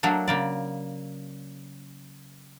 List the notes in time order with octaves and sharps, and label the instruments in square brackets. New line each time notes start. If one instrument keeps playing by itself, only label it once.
[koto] F#3 A3 A#3 D4
C#3 A#3 D5